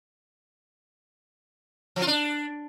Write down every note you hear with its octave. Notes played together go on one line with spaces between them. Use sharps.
F3
F4
D4